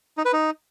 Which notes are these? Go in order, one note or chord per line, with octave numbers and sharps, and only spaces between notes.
D#4
B4
D#4